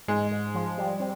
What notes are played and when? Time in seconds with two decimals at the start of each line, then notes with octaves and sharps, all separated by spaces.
0.08 G#2 G#3
0.31 G#2
0.55 F3
0.78 G3
1.00 C4